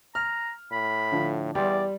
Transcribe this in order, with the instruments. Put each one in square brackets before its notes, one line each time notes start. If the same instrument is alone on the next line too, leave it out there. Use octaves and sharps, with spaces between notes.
[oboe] A#5 [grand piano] F6
[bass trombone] A2 [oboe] B5
[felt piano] D3 F3
[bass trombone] E2 [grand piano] G3 [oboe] D5 [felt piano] G5 C6